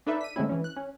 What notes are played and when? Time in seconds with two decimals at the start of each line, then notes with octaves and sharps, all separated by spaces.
0.06 D4 D#4 A4 B4 D5 E5
0.21 B6 D#7
0.36 D3 G#3 A3 C4 C#4 E4
0.49 E3 C#4
0.64 F#6
0.76 C#4